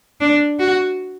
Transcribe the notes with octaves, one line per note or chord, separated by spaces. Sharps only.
D4
F#4